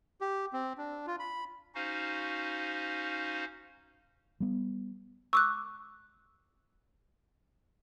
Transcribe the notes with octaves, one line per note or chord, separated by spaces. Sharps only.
G4
C4
D4
F4
B5
C#4 D#4 F#4 C5 F5
G3 B3
C#6 D6 E6 F#6